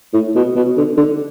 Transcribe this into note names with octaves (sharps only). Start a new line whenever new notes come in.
A2
B2
B2
D3
D3